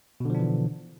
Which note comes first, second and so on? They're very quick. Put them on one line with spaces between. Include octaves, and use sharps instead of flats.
B2 D3 F3 D4 E3